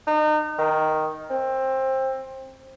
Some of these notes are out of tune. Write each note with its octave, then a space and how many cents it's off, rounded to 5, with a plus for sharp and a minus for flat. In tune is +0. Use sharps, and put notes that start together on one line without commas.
D#4 -35
D#3 +5
C4 +20